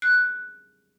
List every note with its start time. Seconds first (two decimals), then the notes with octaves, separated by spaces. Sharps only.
0.02 F#6